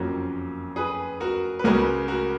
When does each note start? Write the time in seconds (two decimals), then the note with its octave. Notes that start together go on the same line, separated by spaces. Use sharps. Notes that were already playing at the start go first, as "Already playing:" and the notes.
Already playing: F#1 F2 F3 A#3 C#4 F#4 A#4
0.76 G#4 B4
1.20 F#4 A#4
1.59 B4
1.64 C#2 C#3 G#3 C#4 F#4 A#4
2.08 F#4 A#4